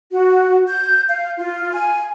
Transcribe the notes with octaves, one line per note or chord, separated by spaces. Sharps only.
F#4
G6
F5
F4
G#5